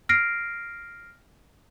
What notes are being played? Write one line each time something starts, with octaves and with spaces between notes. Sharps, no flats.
F6 A#6 C7 D7